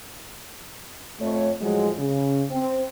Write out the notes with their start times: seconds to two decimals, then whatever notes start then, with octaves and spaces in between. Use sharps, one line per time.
1.20 F2 A3 C#5
1.61 A2 F3 F#3 G#3
1.98 C#3
2.51 C4